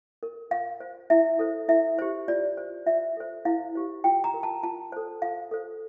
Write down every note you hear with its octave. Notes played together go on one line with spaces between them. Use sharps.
A#4
F4 F5
C5
E4 E5
A4 C5
E4 E5
G4 C5
F4 D5
C5
F4 E5
A4 C5
E4 F5
G4 C5
F4 G5
A#5
A#4
A5
F4 A5
A4 C5
F4 F5
A4 C5